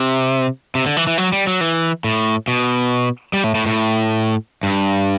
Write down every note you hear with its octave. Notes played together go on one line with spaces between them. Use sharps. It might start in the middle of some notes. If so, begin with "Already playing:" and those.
Already playing: C3
C3
D3
E3
E3
F#3
G3
F#3
E3
A2
B2
G3
A2
A2
A2
G2